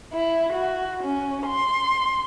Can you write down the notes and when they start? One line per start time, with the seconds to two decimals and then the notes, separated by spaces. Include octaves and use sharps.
0.12 E4
0.52 F#4
1.02 C#4
1.46 C6